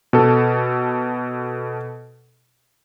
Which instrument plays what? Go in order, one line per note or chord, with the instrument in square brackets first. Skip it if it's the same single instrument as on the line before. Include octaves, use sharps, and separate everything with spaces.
[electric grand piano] B2 A4